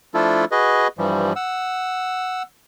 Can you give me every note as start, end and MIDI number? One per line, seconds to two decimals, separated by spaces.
0.14 0.45 53
0.14 0.45 57
0.14 0.45 62
0.14 0.45 64
0.14 0.45 65
0.14 0.45 69
0.52 0.88 66
0.52 0.88 68
0.52 0.88 71
0.52 0.88 75
0.98 1.33 43
0.98 1.33 52
0.98 1.33 53
0.98 1.33 55
1.36 2.43 78
1.36 2.43 88